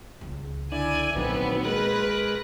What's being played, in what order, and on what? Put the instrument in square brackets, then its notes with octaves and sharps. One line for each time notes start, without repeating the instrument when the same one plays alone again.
[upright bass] C#2 D#3
[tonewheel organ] D3 E4 D5 [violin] G#5
[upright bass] A#1 [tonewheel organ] D#3 F#3 C4 [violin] B3
[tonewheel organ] G#3 A#4 F#6 [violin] B4